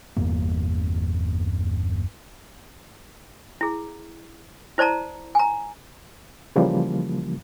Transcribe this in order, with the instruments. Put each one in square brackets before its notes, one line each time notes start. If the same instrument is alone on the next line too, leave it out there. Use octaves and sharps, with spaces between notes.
[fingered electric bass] G1 E2 G2 A#3
[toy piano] E4 G#4
E4 C5 D5 A5 A#5
G#5 A#5
[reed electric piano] C#3 E3 F3 G3 A#3